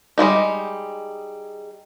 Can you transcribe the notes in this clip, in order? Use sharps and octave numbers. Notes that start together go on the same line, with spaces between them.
G3 G#3 A#3 D#4